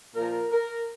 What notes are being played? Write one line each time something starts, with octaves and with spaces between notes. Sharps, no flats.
A#2 F3 A#4
A#4